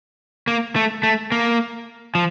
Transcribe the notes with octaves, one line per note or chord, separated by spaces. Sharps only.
A#3
A3
A3
A#3
F3